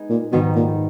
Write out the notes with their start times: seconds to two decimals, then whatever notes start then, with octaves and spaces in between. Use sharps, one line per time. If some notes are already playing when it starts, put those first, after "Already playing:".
Already playing: G#3 B3 D#4 G#4
0.09 A#2
0.32 G#2 B2 D#3 G3 B3 D#4
0.56 A#2